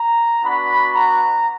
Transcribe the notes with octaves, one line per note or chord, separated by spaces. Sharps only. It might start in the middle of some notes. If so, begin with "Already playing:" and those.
Already playing: A#5
B3 D4 F#4 B5
A#5